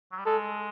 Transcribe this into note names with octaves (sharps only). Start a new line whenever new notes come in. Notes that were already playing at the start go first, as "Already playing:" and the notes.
F#3
G3
G#3 A4